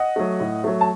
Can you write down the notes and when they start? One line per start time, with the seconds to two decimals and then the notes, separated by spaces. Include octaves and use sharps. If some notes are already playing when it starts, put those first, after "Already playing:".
Already playing: D#5 F#5
0.16 F#3 A3
0.40 A2
0.64 F#3 A3
0.81 A5